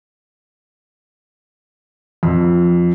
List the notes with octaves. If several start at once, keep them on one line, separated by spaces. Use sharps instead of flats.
F2